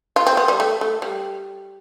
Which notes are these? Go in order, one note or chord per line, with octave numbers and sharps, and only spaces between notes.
F4
C4
B3
G3
A3
A3
G3